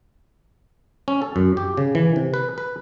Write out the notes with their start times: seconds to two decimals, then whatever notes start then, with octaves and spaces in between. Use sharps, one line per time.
1.08 C#4
1.22 A4
1.36 F#2
1.57 G4
1.77 C#3
1.95 E3
2.16 C3
2.34 B4
2.58 B4